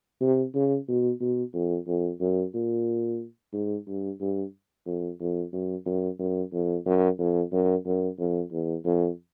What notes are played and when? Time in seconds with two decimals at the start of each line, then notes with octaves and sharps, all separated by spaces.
0.21 C3
0.55 C#3
0.88 B2
1.21 B2
1.54 F2
1.87 F2
2.20 F#2
2.54 A#2
3.53 G#2
3.87 G2
4.20 G2
4.86 F2
5.20 F2
5.53 F#2
5.86 F#2
6.19 F#2
6.53 F2
6.86 F#2
7.19 F2
7.52 F#2
7.86 F#2
8.19 F2
8.52 E2
8.85 F2